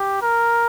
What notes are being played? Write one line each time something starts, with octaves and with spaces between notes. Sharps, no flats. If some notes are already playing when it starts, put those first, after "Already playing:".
Already playing: G4
A#4